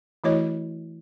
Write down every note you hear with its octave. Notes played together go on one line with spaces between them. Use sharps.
E3 A3 E4 F#4 C#5 D#5